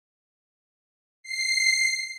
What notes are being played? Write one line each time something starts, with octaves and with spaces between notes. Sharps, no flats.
C7